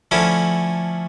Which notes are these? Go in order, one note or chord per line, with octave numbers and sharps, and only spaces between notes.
D3 F3 A3 C#4 E4